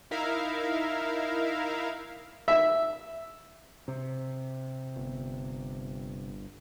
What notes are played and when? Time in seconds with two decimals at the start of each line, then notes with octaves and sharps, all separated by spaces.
0.11 D#4 E4 A#4 E5 F5
2.48 E5
3.88 C3
4.96 G1